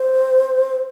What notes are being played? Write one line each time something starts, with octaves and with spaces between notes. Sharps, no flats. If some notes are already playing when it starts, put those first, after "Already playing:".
Already playing: C5